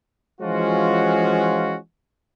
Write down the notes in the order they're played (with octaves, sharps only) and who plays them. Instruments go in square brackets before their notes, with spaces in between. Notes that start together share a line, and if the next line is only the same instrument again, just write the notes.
[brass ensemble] E3 F3 G#3 C#4 F4 F#4